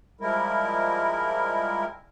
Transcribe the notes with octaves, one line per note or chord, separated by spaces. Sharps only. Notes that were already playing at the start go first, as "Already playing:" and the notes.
F3 G3 G#3 E4 A#4